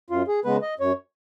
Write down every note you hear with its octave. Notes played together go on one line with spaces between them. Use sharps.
F#2 F4
G#4
C#3 G#3 B3 B4
D#5
F#2 C#5